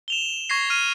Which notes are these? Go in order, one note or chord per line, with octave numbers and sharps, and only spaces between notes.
E7 F7 G7
C#6 G#6 A#6 C7
F6 D#7